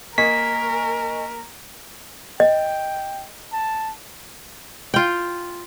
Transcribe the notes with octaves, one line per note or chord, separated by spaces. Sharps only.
A#3 A#4 D#5 G#5 C#6 B6
D#5 G5
A5
F4 G5